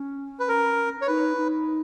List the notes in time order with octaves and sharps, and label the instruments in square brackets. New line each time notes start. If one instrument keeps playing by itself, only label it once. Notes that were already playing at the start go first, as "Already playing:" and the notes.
Already playing: [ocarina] C#4
[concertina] B4
A#4
C#5
[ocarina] D#4 [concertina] B4
[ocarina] D#4